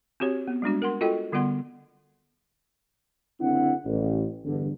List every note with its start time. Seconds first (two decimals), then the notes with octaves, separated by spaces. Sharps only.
0.20 C4 F#4 G4 C#5
0.47 B3
0.62 G3 G#3 D4 F#4
0.82 A#4 F#5 C6
1.01 F4 F#4 A4 D#5 G5
1.32 D3 G3 B3 F#5 C6
3.41 F#1 D3 C4 D4 E4 F#5
3.85 A1
4.45 E2 G2 D3